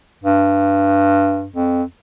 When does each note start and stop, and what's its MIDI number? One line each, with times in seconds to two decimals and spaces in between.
0.23 1.48 43
1.56 1.83 41